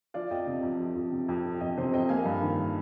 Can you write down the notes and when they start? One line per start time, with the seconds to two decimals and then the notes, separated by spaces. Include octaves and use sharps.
0.14 F3 D5 F5
0.31 F2 D#5 G5
0.47 C3
0.63 F2
0.80 F3
0.95 F2
1.12 C3
1.28 F2
1.45 F3
1.60 F2 D#5 G5
1.78 C3 C5 D#5
1.93 F2 D#5 G5
2.09 A#3 F5 G#5
2.25 G2
2.42 D#3